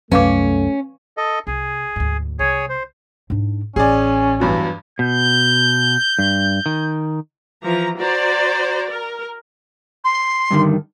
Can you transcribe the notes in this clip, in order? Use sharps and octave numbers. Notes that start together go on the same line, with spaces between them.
C2 F#2 A3 C#4 B4 F5 D6
A4 D#5
C2 G#4
D2 G#2
C2 G#4 C#5
C5
G#2 D4
A1 C#4 G#4 D5
E2 G2 F#3
B2 G6
G2
D#3
E3 F3 A#5
F#4 C5 D5 A#5
A#4
C6
G2 D3 D#3